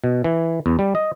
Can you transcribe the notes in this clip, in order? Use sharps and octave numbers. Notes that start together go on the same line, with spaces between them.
B2
E3
E2
G3
D#5